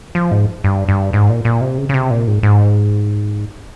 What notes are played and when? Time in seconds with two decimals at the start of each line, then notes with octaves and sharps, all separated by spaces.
0.15 F3
0.31 G#2
0.64 G2
0.89 G2
1.13 G#2
1.30 A#2
1.45 A#2
1.61 C3
1.78 C#3
1.89 C#3
1.94 C3
2.11 A#2
2.27 G#2
2.43 G#2